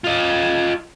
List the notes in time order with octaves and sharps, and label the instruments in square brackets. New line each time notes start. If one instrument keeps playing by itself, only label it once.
[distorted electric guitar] F4 D#5